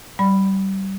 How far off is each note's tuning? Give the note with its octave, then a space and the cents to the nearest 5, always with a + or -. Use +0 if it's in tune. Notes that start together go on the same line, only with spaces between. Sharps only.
G3 -25 D5 +0 B5 +0